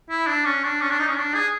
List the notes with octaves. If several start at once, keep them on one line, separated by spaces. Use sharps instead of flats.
E4
D4
C#4
D4
C#4
D4
D#4
C#4
D4
G#4